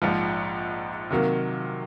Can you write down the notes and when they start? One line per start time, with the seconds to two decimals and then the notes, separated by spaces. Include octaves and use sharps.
0.02 A#1 G#2 F3
1.10 C3 D#3 F#3 A#3